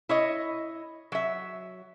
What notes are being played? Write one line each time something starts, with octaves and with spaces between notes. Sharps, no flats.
E4 C#5 D#5
F#3 E5